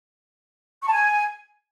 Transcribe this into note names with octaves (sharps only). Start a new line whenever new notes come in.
C#6
A5
G#5